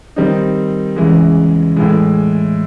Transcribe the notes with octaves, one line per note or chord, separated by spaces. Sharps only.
D#3 G3 C4 D#4
E2 C#3 E3 G#3
A2 E3 G#3